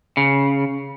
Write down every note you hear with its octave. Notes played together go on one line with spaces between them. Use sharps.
C#3